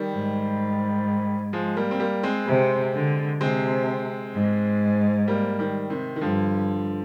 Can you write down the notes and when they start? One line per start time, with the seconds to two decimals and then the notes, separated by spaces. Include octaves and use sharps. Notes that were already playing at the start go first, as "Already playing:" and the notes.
Already playing: D#3 G3
0.12 G#2
1.53 F3 G#3
1.77 G3 A#3
1.91 C4
2.00 G3 A#3
2.23 G#3 C4
2.47 C3
2.94 D3
3.41 C3 G#3 C4
4.34 G#2
5.28 G3 A#3
5.59 D#3 G3
5.90 C3 D#3
6.16 D#3
6.21 G2 D3 F3